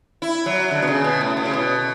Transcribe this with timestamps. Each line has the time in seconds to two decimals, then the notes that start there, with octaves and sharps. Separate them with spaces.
0.22 E4
0.46 F#3
0.71 D3
0.82 B2
0.87 C#3
1.04 B2
1.21 A2
1.37 A2
1.46 C#3
1.53 B2